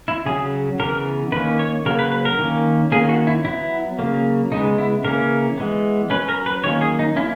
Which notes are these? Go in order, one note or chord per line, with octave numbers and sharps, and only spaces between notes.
E4
C#3 F#3 C#4 G#4
C#3 E3 B3 A#4
D#3 A#3 C#4 B4
C#5
C#3 F#3 A#3 A#4
B4
B4
A#4
D#3 A#3 C#4
D#3 A#3 C#4 G#4
F#4
E4
F#3 B3 E4
C#3 F#3 A#3
C#3 G#3 B3 D#4
E4
C#3 E3 A#3 C#4 A#4
E3 G#3 B3
F#3 C#4 B4
A#4
B4
D#3 F#3 A#3 C#4 C#5
G#4
D#4
A#3 C#4 E4